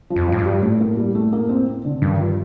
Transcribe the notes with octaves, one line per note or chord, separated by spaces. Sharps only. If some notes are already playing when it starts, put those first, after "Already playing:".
F3
F2
A2 F3
G2
G3
A2 A3
A#3
G3
A3
A#3
C4
C4
A#2 D3
A2
G2 D#3
F3